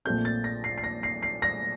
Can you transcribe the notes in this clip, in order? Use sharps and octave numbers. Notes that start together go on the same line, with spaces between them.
A#1 A#2 A3 C4 G6
A6
A#6
C7
C7
A#6
C7
C7
A#6